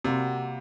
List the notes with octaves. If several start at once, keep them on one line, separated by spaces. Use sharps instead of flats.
C3 G3 A#3 F#4